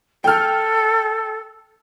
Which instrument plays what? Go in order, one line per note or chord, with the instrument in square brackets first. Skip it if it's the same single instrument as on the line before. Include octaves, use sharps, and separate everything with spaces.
[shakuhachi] A4 [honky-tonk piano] G5 F6